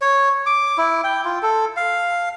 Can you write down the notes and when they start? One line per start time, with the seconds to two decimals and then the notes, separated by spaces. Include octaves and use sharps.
0.01 C#5
0.46 D6
0.78 E4
1.04 G5
1.25 F4
1.43 A4
1.77 F5